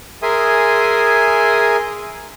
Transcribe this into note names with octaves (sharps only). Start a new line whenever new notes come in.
G#4 A#4 E5 G#5 C6 D#6